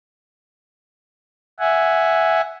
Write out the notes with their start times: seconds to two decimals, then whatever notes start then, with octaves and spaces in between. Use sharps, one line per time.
1.59 E5 F#5 G#5